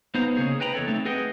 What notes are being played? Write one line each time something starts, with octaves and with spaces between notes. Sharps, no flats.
B3 D#4 C5 F5 A#5
C#3 A#3 G#4 C#5
B4 D#5 G5 A#5 B5
E2 A4 C#5
A3 C4 D#4
G#4 B4 D#5 F#5 G5